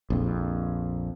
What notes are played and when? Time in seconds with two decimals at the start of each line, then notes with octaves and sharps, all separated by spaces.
0.10 A#1 F2